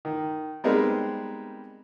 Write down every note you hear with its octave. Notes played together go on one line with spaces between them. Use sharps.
D#3
G3 G#3 B3 C4 D#4 A#4